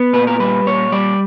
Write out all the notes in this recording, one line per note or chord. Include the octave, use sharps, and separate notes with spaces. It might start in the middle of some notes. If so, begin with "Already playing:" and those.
Already playing: B3
A#2 B4
A#4
G3 B4
A#2 C#5
G3 D5